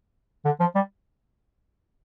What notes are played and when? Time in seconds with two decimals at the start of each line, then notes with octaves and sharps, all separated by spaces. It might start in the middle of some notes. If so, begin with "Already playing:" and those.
0.45 D3
0.60 F3
0.75 G3